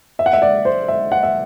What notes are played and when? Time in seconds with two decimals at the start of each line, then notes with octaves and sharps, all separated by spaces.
0.19 E5
0.26 F#5
0.33 E5
0.42 D5
0.65 C5
0.88 E5
1.12 F#5
1.23 E5